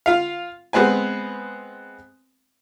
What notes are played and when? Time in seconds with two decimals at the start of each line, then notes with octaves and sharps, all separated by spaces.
0.06 F4 F5
0.73 G#3 B3 C4 B4 G#5